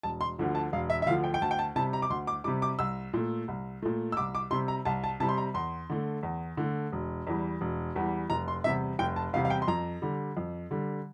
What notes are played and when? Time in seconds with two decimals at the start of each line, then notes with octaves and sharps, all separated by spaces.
0.03 E1 A5
0.21 C6
0.38 D2 D3 F3
0.55 A5
0.72 E1 F5
0.90 E5
1.02 E5
1.06 D2 D3 F3 F5
1.24 G5
1.34 G5
1.41 D2 A5
1.51 G5
1.59 A5
1.76 C3 G3 A5
1.93 A#5
2.02 D6
2.10 D2 C6
2.27 D6
2.44 C3 G3 D6
2.62 D6
2.79 C2 E6
3.13 A#2 A3
3.48 C2
3.82 A#2 A3
4.12 E6
4.17 C2 D6
4.35 D6
4.51 C3 G3 C6
4.68 A#5
4.85 C2 A5
5.04 A5
5.20 C3 G3 A5
5.29 C6
5.38 A#5
5.54 E2 C6
5.90 D3 A3
6.23 E2
6.57 D3 A3
6.92 E1
7.27 E2 E3 G3
7.61 E1
7.95 E2 E3 G3
8.30 F1 A#5
8.48 C6
8.64 E2 C3 G3 E5
8.99 F1 G5
9.16 A5
9.33 E2 C3 G3 F5
9.45 F5
9.50 G5
9.62 C6
9.68 F2 A#5
10.02 D3 G3
10.37 F2
10.71 D3 G3